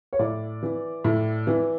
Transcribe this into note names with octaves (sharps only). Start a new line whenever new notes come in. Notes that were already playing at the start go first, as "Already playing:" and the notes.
C#5
A2 D5
E3
A2
E3